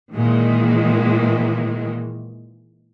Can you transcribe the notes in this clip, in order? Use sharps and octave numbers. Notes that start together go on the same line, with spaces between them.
A#2 D#3 E3 G#3 A#3